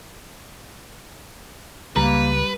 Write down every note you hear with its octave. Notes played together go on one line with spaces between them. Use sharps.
C#2 G3 A#3 B4 A#5